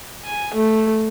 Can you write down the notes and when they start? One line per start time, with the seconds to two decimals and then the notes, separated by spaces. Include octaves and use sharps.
0.25 G#5
0.54 A3